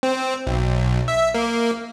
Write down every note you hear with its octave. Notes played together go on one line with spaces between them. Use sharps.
C4
B1
E5
A#3